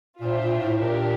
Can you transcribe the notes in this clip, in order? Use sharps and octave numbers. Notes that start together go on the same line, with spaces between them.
A#2 D4 F4 C5 E5 G5
A#2
A2
A#2 D4 G4 A#4